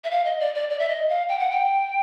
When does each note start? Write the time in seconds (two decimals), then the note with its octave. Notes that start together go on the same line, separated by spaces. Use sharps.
0.04 E5
0.11 F5
0.25 D#5
0.40 D5
0.55 D5
0.70 D5
0.79 E5
0.88 D#5
1.09 F5
1.28 G5
1.39 F#5
1.50 G5